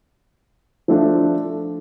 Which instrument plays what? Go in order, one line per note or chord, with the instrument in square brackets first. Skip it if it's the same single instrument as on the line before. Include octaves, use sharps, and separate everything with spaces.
[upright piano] F3 A3 D4